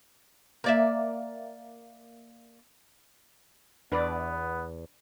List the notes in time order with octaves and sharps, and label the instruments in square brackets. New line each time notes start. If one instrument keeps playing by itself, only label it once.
[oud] A#3 D5 E5
[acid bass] E2 [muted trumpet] B3 [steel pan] D4 B4 D5